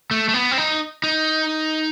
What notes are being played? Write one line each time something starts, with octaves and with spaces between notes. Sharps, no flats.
A3
A3
B3
C4
D#4
D#4